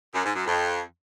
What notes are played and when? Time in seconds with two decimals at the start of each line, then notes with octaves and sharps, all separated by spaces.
0.15 F#2
0.25 G#2
0.35 F#2
0.46 F2